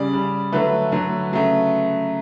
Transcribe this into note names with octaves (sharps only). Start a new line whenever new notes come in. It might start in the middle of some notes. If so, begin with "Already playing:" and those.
Already playing: C#3 G3 D5
C#3 G3
D3 F#3 A3 B4
D3 F#3 A3
C#3 F#3 A3